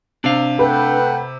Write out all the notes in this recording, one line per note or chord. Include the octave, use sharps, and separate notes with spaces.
C3 D4 F5
A3 B4 F#5 G5